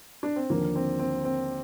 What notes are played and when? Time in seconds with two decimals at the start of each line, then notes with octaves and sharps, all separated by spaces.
0.23 D4
0.36 C4
0.50 D#2 D3 F3 A#3
0.76 C4
0.99 C4
1.25 C4